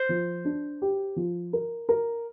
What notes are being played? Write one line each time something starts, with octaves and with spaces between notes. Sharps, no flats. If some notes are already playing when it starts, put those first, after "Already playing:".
Already playing: C5
F3
D4
G4
F3
A#4
A#4